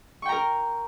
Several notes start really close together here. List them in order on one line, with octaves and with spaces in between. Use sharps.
C#6 G5 A#5 A#4